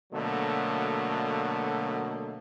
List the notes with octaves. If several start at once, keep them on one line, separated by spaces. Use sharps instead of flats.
B2 D3 F#3 A3 A#3